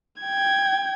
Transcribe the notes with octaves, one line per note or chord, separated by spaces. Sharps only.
G5 G#6